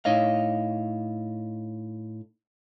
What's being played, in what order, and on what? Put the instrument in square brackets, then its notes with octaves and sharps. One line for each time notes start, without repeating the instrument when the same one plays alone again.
[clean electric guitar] A2 D#4 C#5 D#5 F5